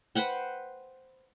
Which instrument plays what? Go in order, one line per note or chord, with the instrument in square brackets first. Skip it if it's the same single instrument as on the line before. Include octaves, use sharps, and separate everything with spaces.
[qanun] B4 C5 F#5 G5